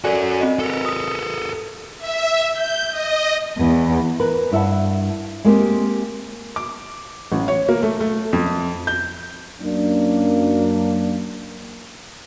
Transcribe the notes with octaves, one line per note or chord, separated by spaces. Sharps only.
F#4 A4 A#4 D5 G#5
C4 D#5
A4 A#4
D#6
E5
G6
D#5
E2
A#4 B4
G2 E4 E5 F#5 A5
G#3 A#3 C4 G4
D6
A1
C#5
A#3
A3
A3
F2
G6
F#2 A#3 D4